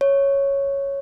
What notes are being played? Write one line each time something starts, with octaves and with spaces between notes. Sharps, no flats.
C#5